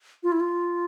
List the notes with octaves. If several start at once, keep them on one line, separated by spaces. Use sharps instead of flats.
F4
E4
F4